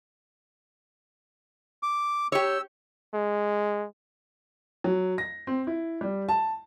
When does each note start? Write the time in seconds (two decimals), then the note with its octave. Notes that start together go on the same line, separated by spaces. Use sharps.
1.83 D6
2.32 G4 C#5 E6
3.14 G#3
4.84 F#3
5.18 A#6
5.47 C4
5.67 E4
6.01 G3
6.29 A5